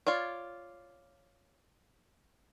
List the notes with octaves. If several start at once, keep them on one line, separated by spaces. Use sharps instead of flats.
F4 C#5 D5